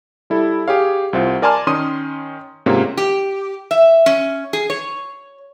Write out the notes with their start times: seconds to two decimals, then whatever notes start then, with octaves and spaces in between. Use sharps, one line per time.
0.30 G3 E4 A4
0.68 G4 G#4 C#5 F5
1.13 C2 C4 F4
1.42 A#4 D5 G#5 A5 C6 F6
1.67 D#3 C#4 C6 D#6 D#7
2.66 G#2 C3 A#3 C#4 F4
2.97 G4
3.71 E5
4.06 C#4
4.53 G#4
4.70 C#5